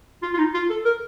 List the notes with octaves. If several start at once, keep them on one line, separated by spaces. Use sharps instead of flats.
F4
F4
D#4
F4
A4
A#4